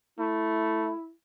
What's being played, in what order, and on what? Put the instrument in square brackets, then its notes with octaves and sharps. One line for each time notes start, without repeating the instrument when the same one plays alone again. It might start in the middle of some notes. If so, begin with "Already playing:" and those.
[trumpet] A3 [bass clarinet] E4